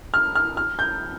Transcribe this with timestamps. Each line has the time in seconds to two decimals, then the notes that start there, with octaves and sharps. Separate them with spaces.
0.14 F6
0.35 F6
0.57 F6
0.79 G6